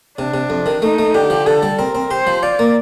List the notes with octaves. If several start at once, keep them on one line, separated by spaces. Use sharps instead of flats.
C3 D4
C3
F2
D#3
A3 D#4
A3
D3 G4
F3
D3 A4
G3
C4 A#4
C4
G4 C5
F3
F4 D5
A#3